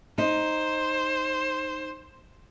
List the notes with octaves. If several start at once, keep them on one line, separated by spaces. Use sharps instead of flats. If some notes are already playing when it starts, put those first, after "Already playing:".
D#4 C5